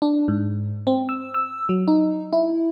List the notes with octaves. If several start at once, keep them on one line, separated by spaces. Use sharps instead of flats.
D4
G#2
C4
E6
E6
F#3
D#4
E4